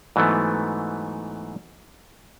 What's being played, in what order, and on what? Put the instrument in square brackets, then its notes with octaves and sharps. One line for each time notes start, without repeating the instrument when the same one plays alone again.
[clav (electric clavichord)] G#2 E3 F#3 A3 B3